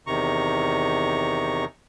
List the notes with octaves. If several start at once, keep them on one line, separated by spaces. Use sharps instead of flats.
E2 C3 D#3 A#5 C#6